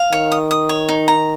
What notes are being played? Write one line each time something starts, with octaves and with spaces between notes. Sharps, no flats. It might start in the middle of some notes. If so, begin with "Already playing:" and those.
Already playing: F5
D#3 C#5
D#6
D#6
C#5
D#4
A#5